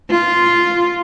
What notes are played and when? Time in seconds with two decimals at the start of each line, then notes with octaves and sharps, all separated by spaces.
0.10 F4